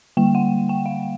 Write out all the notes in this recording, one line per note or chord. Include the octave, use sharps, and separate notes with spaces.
D3 G3 A#3 G5
F#5
G5
F5